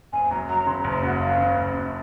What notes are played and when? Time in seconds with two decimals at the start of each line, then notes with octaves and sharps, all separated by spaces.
0.13 F#1 G#5
0.31 F#2 A#5
0.49 F#3 A#5
0.67 C#3 C6
0.79 A#5
0.84 F#1
0.93 C6
1.03 F#2 F#5
1.20 F#3 F5
1.38 C#3
1.57 F#1
1.74 F#2